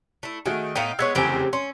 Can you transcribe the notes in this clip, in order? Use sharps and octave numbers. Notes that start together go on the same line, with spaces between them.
A3 E4
D#3 A3 F#4 G#4
A2 B3 D#4 F5 G5
G#3 B3 C#5 E6 G#6 C#7
F1 E2 C#3 C4 G4 G#5
C#4 C6